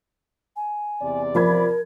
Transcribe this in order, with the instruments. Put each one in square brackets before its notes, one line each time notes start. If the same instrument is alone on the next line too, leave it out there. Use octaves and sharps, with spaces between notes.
[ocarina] G#5
[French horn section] E2 C3 D5
[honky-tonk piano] F3 B5 G#6 [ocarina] A#4